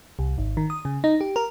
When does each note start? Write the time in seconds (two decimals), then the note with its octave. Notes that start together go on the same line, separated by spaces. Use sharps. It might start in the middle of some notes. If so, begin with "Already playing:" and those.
0.19 C2
0.38 G#1
0.57 D#3
0.70 D#6
0.85 C#3
1.04 D#4
1.21 G4
1.36 A#4